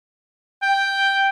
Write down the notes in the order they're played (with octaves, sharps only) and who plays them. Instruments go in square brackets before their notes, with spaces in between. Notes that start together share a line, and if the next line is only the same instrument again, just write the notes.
[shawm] G5